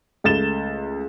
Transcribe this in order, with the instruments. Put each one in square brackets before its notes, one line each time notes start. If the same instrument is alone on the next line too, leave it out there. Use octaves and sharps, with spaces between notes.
[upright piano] C#2 A3 A6 E7 G7